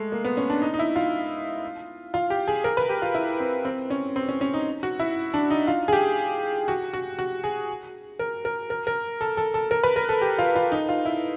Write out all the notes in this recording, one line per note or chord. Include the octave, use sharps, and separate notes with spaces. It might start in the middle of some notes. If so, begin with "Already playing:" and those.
Already playing: G#3 A3
A#3
B3
C#4
D4
D#4
D#4
E4
F4
F4
G4
G#4
A#4
B4
G4
F4
E4
C4
C4
C#4
C4
C#4
C#4
D#4
F#4
E4
D4
D#4
F4
G#4
G4
F#4
F#4
F#4
G#4
A#4
A#4
A#4
A#4
A4
A4
A4
A#4
B4
A#4
A4
G4
F4
F4
D#4
F4
E4